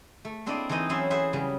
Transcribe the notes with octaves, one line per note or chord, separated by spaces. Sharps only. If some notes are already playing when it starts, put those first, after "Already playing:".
A3
A#3 C4 D4 E4 D5 D#5
E3 A3 C4 D#4 D#5
E3 F#3 C#4 E4 C5 E5
G#4 C5 E5 F#5
C#3 F#3 G3